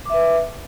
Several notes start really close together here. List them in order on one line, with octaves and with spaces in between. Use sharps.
D6 E5 B4